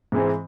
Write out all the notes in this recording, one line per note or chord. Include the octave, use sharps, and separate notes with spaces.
G#2 E3 G#3 C4